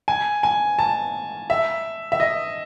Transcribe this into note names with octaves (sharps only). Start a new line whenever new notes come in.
G#5
G#5
A5
E5
E5
D#5